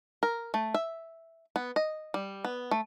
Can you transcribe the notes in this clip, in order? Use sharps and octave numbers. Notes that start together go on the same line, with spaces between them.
A#4
A3
E5
B3
D#5
G3
B3
A3